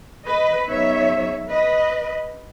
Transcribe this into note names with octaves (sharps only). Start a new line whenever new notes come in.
B4 D#5
C#3 F#3 B3 D#4 C#5 E5
B4 D#5